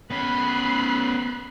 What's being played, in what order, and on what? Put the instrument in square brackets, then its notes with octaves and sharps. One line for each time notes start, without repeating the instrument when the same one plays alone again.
[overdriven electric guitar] B3 C#4 [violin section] B5 F#6 C7